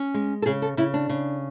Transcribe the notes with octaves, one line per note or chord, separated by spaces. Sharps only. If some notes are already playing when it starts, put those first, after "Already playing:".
Already playing: C#4
G#3
A4
C#3 G#4
A4
C#3 E4
D4
C#3